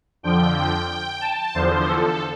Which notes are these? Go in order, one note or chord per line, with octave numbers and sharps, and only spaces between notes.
F2 D3 F3 G5
G5
G5
A5
E2 D3 F3 C5
A4